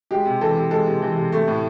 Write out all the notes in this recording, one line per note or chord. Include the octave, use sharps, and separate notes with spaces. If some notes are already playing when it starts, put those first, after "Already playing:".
G#3 G4
C3
E3 A4
C3
G#3 A4
C3
E3
C3
A3
A2